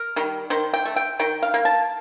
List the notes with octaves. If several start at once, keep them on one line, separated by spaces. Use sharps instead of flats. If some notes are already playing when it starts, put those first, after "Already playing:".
Already playing: A#4
D#3 G3
D#3 C5
G5
A3
G5
D#3 G5
F5
A#3
A5